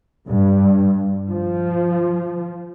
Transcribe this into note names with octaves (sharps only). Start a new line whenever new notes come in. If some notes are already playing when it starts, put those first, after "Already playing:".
G2
F3